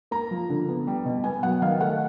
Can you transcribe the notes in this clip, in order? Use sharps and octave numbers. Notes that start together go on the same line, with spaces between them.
A#3 A#5
F3
D3
B3
G3
B2
B3 G#5
F#3 F#5
D#3 F5
A3 F#5